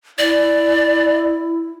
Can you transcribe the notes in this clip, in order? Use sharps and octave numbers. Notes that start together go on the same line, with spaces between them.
E4 D5